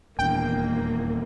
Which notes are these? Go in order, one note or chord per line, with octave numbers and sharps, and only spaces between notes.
D#1 E2 A#3 D4 G5